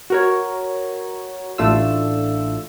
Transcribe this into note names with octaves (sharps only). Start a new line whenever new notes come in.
F#4 A#4 C#5
A1 A3 D4 F4 E6